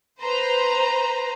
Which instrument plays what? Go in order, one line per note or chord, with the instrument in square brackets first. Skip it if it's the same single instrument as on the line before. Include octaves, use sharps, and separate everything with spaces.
[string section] B4 C5 A#5